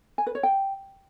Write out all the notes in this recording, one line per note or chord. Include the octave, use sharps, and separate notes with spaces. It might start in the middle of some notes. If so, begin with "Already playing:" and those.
G#5
B4
C#5
G5